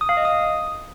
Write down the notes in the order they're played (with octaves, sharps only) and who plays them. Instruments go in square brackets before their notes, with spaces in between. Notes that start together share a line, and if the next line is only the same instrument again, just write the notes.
[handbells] D#6
F5
D#5
D#6